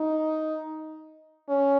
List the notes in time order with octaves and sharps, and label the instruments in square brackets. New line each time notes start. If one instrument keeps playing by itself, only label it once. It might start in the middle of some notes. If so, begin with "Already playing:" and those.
Already playing: [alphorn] D#4
C#4